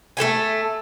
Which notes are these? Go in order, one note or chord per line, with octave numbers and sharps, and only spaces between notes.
A3 A4 G5 G#5